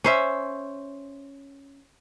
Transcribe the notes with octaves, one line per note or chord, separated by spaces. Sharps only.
C#4 C5 E5